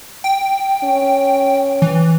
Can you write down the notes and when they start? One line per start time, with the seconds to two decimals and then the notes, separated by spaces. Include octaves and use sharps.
0.24 G5
0.84 C#4
1.82 E3